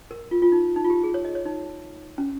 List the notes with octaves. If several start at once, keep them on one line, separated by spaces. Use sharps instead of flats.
A#4
F4
F4
D#4
D#4
F4
G4
G#4
C#5
D#5
C#5
D#4
C#4